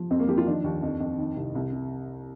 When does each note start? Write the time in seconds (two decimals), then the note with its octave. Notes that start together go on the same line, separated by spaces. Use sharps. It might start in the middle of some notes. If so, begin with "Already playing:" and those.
Already playing: F3
0.10 F2 C4
0.19 A#3
0.28 F3 G4
0.38 F4
0.46 D#3 D4
0.64 D#2
0.83 F2
1.00 F2
1.18 D#3
1.36 C2
1.55 C2
1.72 C3